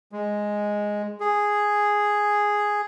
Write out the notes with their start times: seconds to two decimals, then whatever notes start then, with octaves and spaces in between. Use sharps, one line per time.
0.12 G#3
1.20 G#4